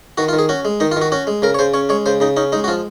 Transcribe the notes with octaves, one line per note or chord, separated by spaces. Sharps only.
D#3 F#4
F4
D#3
G#4
C#4 F#4
G#3
D#3 D#4
F4
D#3
F#4
C#4 F#4
G#3
C#3 A#4
C#5
C#3 C5
C#4 C#5
G#3 C#5
C#3 C5
C#3 D#4
C#4 D#4
G#3 D#4
F#4
F3 F4